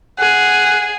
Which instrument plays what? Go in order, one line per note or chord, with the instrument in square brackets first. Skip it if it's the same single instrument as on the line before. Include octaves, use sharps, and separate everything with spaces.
[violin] G#4 [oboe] F#5